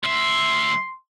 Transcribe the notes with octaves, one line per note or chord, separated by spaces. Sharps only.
D2 E5 C6